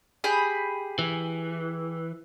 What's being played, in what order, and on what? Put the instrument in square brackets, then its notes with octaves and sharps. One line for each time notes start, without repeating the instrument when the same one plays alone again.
[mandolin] G4 G#4 B5
[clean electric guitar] E3